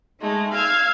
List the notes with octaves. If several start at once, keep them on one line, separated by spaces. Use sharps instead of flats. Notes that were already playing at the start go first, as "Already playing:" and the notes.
G#3 A3 D#4
F5 E6 F6 G#6